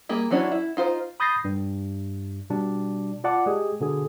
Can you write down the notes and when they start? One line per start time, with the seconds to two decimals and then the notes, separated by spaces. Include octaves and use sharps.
0.09 G3 A#3 G#4
0.31 E3 F#3 C#4 D4 E4
0.52 E4
0.77 D#4 F4 C5
1.20 B5 D#6 G6 A6 A#6 C7
1.44 G2
2.50 B2 G3 D4
3.24 F4 D5 F#5 A5 D6
3.46 G#3 G4 G#4
3.80 B2 D3 G#4